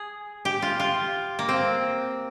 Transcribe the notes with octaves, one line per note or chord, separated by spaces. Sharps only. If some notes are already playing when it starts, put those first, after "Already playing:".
Already playing: G#4
G4
F4
F4
A#3
C4